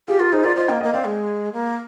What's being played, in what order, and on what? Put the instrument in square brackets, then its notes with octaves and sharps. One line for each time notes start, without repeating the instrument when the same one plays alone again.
[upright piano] F4 G#4 [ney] G4
[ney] F4 [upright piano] G4 A#4
[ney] D#4 [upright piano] G#4 C5
[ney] F4 [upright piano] A#4 D5
[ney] F4 [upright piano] C5 D#5
[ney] A#3 [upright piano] D#5 G5
[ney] A#3 [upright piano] D#5 G5
[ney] C4 [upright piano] D5 F5
[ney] G#3
A#3